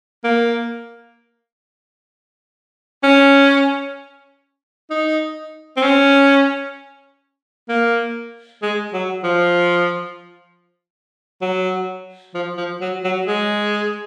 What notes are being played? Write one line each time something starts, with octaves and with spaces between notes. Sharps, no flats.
A#3
C#4
D#4
C4
C#4
A#3
G#3
F#3
F3
F#3
F3
F3
F#3
F#3
G#3